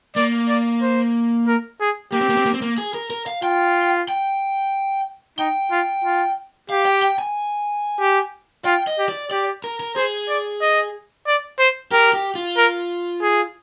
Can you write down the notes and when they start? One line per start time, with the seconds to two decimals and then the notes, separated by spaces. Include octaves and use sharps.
0.16 A#3 D5
0.49 D5
0.82 C5
1.47 A#4
1.81 G#4
2.12 A#3 G4
2.21 C4
2.29 A#3
2.37 C4
2.46 A#3
2.54 C4
2.62 A#3
2.78 G#4
2.94 A#4
3.10 A#4
3.27 F5
3.43 F4 G5
4.09 G5
5.38 D#4 G5
5.71 F4
6.04 F4
6.70 G4 F5
6.86 G5
7.03 G5
7.19 G#5
8.00 G4
8.65 F4 G5
8.87 D#5
8.99 G4
9.09 D5
9.31 G4 D5
9.64 A#4
9.80 A#4
9.96 G#4 C5
10.29 D5
10.61 D#5
11.27 D5
11.59 C5
11.91 G4 A#4
12.13 G4
12.35 F4
12.57 A#4
13.22 G#4